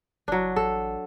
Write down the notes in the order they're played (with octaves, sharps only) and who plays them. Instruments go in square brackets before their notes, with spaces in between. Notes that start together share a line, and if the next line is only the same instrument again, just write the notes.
[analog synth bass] F#1 [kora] F#3 D4
[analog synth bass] A1 [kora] A4